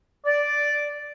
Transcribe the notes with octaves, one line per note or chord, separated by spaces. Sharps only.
D5